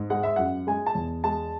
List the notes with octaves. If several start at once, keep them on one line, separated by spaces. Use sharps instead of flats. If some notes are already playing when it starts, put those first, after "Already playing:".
Already playing: G#2
G#3 F#5
E5
F#2 F#5
G#3 G#5
A5
E2
G#3 A5